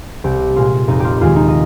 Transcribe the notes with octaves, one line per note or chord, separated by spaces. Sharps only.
C2 G4
A#2 G#3 C4 F4
F1 D#4
F4 G4
D#2 D#3 G#3 F4
D#4
D#5